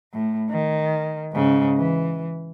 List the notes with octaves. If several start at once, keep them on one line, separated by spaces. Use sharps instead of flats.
A2
D#3
G#2 C#3
E3